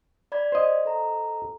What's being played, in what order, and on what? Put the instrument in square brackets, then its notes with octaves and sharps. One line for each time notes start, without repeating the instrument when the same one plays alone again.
[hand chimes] D5 B5 G#6
[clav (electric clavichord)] C5 D#5
[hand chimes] A4 A#5